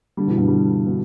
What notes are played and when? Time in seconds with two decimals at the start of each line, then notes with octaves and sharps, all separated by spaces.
0.17 D3 G3
0.27 B2 E3
0.37 G2 B2
0.48 D3 G3
0.86 B2